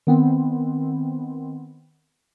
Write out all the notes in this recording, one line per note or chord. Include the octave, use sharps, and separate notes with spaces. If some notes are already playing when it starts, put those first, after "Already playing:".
D#3 B3 C4